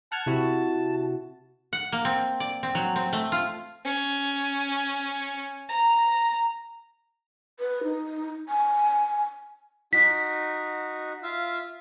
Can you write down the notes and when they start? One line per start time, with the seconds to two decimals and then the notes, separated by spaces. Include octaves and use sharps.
0.12 F#5 A5 F6 G#6
0.26 C3 E4 F#4
1.73 F#5
1.92 A#3
2.05 C4
2.40 D5
2.63 C4
2.75 F#3
2.96 C4
3.13 A3
3.32 F4
3.85 C#4
5.69 A#5
7.60 B4
7.83 D#4
8.49 G#5
9.93 D#4 F#4 B6
11.23 F4 E5 F5